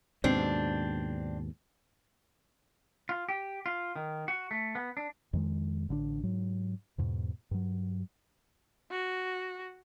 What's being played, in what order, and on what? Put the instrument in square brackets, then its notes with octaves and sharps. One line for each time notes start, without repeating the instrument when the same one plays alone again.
[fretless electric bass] D#2 G#2 B2 [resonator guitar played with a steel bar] C4 D4
[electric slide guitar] F4
G4
F4
D#3
F#4
A3
B3
D4
[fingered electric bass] F2 D#3 G#3
A1 D3 F#3 D4
G#2 F#3
E2 G#2 B2
G2 F#3
[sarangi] F#4